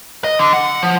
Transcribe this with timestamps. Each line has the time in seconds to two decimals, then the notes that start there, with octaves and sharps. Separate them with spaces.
0.24 D#5
0.39 D3
0.53 F#5
0.83 F3